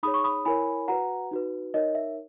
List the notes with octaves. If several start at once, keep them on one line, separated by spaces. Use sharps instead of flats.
D#4 G#4 C#5 B5 D#6
C#6
B5 D#6
E4 A#4 C#5 G#5 B5
F#4 B4 F#5 A#5
D#4 F#4 B4
D#4 A#4 C#5 D#5
E5